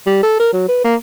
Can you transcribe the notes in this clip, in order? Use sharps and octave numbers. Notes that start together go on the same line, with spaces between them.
G3
A4
A#4
F#3
B4
A#3